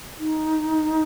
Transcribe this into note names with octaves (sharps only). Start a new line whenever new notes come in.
D#4